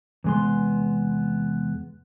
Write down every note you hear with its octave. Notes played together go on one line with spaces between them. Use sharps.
E2 C3 G#3 B3 C6